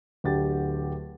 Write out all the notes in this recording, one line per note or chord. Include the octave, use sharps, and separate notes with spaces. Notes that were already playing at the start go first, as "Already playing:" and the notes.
D1 D3 G4 A6